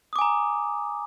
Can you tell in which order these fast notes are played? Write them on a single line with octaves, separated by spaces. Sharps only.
D#6 D6 G#5 A#5